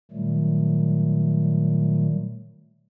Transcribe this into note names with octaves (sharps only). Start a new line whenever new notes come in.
A#2 D#3 F#3 G3 A3